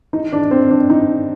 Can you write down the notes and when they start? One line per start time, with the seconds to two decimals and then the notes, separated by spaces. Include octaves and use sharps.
0.13 D#4
0.33 D4
0.51 C4
0.71 D4
0.90 D#4